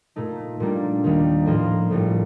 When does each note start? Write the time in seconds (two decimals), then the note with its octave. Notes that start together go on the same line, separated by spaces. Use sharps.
0.16 A#2 A3 D#4
0.60 A#2 G3 A#3 D4
1.03 D#2 D#3 G3 A#3
1.46 A2 F3 A#3 F4 A#4
1.91 A#1 A2 G3